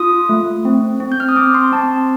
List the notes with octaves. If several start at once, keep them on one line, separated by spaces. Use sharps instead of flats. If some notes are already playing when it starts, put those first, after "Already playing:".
Already playing: F4 D#6
A3
C4
C4
G6
F6
D#6
C4 D6
C6
C4 A5